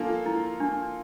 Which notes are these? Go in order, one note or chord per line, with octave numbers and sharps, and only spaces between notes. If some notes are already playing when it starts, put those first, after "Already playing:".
Already playing: F3 A#3 D4 F4 A4
E4
D4